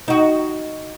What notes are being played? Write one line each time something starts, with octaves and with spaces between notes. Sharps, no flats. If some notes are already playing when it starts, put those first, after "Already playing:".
D#4 F#4